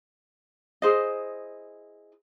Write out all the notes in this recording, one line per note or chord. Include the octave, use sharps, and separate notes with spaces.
E4 G#4 C5 D#5